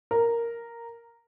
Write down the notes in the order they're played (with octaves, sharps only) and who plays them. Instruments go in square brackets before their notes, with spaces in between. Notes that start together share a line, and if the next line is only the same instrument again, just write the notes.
[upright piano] A#4